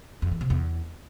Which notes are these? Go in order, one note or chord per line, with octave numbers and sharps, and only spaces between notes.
F2
E3
C3
E2